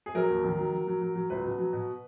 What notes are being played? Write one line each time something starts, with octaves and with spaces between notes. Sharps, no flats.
G#4
F#3 A#4
D#2
D#3
F#3
F#3
F#3
F#3
F#3
C#2 B4
B2
F#3
B2